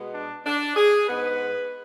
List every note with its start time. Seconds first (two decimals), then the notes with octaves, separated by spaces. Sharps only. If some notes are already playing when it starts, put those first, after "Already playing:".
Already playing: B2 G#3 B3
0.13 D4
0.45 D4
0.77 G#4
1.08 G#2 G#3 B3 B4